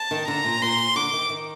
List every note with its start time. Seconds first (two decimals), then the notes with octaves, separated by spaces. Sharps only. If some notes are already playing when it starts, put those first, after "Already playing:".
Already playing: A5
0.11 D#3
0.28 D3 A#5
0.44 A#2
0.62 A#2 C6
0.96 D3 D6
1.13 D#3
1.30 D#3